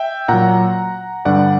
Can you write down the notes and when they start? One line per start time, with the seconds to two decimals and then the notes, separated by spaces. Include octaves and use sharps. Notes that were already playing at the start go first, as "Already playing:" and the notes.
Already playing: E5 G5
0.28 A#2 F#3 F#5 A#5
1.25 G2 D3 G3 D5 F#5